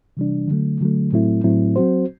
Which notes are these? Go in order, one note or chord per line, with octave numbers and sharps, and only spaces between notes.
C3 E3 G3 D4
D3 F#3 A3
D3 F#3 A3
A2 F#3 A3 C4 E4
A2 F#3 A3 C4 E4
F#3 C4 F#4 C5